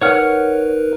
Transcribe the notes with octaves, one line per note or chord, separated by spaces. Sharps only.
D#4 A#4 B4 C#5 F#5 F6